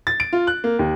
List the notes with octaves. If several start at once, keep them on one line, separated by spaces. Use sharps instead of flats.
A6
D7
F4
F#6
A#3
D#2